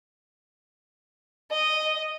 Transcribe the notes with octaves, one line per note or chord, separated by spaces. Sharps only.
D#5